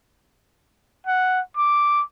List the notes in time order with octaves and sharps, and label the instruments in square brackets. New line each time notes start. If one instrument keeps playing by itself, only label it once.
[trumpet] F#5
D6